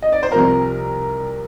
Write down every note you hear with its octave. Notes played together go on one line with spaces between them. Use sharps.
D#5
D5
C5
C2 C3 F3 A#4